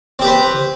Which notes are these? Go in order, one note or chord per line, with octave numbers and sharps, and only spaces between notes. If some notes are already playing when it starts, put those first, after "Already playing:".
C4 G4 B4 C5